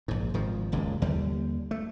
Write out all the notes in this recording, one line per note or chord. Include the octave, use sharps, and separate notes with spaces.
A#1 G#2
G#1 D#3 F3
D#1 C#2 G#2
D#2 D3 G3
A3